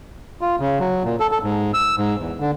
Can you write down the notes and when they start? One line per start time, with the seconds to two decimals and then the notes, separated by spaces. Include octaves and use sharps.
0.41 F4
0.60 C#3
0.80 F#3
1.04 A#2
1.20 A4
1.31 A4
1.43 G#2
1.74 E6
1.98 G#2
2.18 E2
2.40 D3